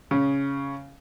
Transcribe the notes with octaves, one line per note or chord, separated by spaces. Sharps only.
C#3